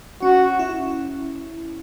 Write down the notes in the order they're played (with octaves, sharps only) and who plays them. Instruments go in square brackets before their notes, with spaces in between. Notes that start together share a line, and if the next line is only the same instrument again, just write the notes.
[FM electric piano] C#4 [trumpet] F#4
[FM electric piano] E4